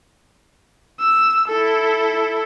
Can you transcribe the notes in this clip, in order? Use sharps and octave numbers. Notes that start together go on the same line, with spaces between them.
E6
E4 A4